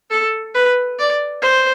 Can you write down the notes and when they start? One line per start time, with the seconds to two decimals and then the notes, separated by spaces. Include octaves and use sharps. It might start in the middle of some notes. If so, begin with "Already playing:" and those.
0.10 A4
0.54 B4
0.99 D5
1.43 C5